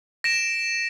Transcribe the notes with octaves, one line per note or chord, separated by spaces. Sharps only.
A#6 D7 E7